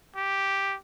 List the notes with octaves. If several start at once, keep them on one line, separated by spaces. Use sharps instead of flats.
G4